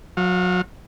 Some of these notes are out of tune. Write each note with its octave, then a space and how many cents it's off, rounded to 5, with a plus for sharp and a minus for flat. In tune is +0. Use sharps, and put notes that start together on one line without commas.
F#3 -30 F5 +0